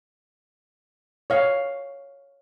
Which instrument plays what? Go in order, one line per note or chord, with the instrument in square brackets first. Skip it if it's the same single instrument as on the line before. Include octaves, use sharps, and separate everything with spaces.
[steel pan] C#5 F5